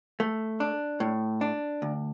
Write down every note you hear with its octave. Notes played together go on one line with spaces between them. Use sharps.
A3
D4
A2
D4
D2